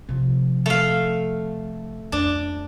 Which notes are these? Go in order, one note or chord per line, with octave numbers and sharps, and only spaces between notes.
C3 F3
A3 F5
F2 D4